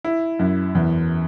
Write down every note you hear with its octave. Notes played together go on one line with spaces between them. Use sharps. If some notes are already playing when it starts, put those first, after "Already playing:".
E4
F#2
E2